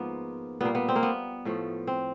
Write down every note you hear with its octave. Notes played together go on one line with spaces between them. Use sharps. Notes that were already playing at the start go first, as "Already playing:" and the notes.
Already playing: G#2 F3 A#3 B3
A#2 G3 A#3 B3
B3
C4
A#3
B3
A2 F3 A3
C4